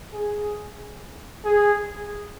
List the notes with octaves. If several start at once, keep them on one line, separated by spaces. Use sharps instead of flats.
G#4
G#4